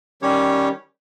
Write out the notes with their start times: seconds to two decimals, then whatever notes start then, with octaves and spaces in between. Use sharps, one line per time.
0.22 D#3 G3 C#4 G4 C#5